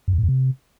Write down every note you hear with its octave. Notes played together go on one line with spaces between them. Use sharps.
F#2
E2
A2
F2
C3